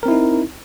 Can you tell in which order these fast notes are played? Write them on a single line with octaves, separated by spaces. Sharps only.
A#4 C4 E4 D#4